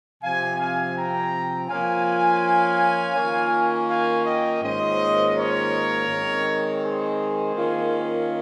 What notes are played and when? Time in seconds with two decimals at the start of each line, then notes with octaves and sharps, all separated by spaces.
0.23 C3 F3 C4 F5 G#5
0.59 F5 G#5
0.95 G5 A#5
1.69 F3 A#3 C#4 F4 F5 G#5
3.16 D#3 A#3 C#4 F4
3.89 F5 G#5
4.25 D#5 G5
4.62 G#2 D#3 A#3 C#4 F4 C5 D#5
5.35 A#4 C#5
6.08 D#3 G#3 C4
6.82 G#4 C5
7.55 D#3 A#3 C#4 F4